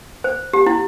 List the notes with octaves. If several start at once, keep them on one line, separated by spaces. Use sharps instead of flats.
C5
G4
E4